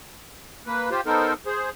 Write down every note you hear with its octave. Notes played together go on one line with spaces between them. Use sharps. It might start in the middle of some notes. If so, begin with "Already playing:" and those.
A#3 B4
F4 G4 C5
B3 D#4 A4 A#4 C5
G#4 C5